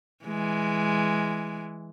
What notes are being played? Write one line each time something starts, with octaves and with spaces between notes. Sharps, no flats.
E3 G#3